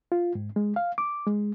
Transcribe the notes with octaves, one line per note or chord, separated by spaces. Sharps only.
F4
G#2
G#3
F5
D6
G#3